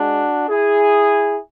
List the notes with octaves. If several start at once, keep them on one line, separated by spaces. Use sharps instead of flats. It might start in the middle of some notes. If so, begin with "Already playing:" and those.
Already playing: G#3 D4 F#4
E4 G#4